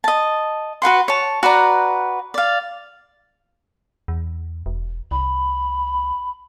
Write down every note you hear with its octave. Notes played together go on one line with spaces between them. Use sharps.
D#5 A5
F#4 B4 F#5 C6
C#5 A5
F#4 B4 D5 A#5
D5 F5
E2
E1
C2 B5